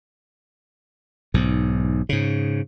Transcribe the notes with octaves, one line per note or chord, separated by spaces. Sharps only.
B1 G#2
G#2 C#3